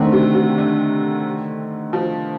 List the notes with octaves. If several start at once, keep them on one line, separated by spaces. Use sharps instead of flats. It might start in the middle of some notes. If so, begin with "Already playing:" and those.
Already playing: D3 D#3 A3 C4
C3
C3
D3
F3